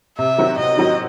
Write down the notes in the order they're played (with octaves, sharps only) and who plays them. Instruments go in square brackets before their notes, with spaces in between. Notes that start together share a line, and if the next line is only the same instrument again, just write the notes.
[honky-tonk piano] C3 [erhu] E5
[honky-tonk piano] D#3 F#3 C4 F#4
[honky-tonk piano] C3 [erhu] D#5
[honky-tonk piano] D#3 F#3 C4 F#4